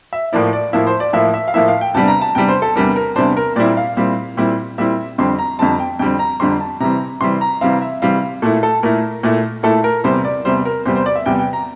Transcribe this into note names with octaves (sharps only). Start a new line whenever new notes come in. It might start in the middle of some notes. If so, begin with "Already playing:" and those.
E5
A2 F3 A#3 E4 D5
D5
A2 F3 A#3 E4 E5
C5
D5
A2 F3 A#3 E4 E5
E5
F5
A2 F3 A#3 E4 E5
F5
G5
E2 C3 G3 D4 A5
A#5
A5
E2 C3 G3 D4 G5
C5
A4
E2 C3 G3 D4 A#4
A#4
E2 C3 G3 D4 C5
A#4
A#2 G3 C4 E4 D5
F5
A#2 G3 C4 E4
A#2 G3 C4 E4
A#2 G3 C4 E4 E5
F2 D3 G3 C4 C6
A#5
F2 D3 G3 C4 A5
G5
F2 D3 G3 C4 G5
A#5
F2 D3 G3 C4 C6
A5
C3 E3 G3 C4 A#5
C3 E3 G3 C4 C6
A#5
C3 E3 G3 C4 F5
E5
C3 E3 G3 C4 F5
A#2 A3 E4 A4
A4
A#2 A3 E4 A#4
A#2 A3 E4
A#2 A3 E4 A4
A#4
E2 C3 G3 C5
D5
E2 C3 G3 C5
A#4
E2 C3 G3 C5
C5
D5
E5
E2 C3 G3 G5
G5
A#5